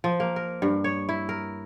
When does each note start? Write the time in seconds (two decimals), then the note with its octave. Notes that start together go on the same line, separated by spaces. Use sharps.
0.04 F3
0.20 A#3
0.36 A#4
0.62 G2
0.84 C#5
1.09 E4
1.29 A#4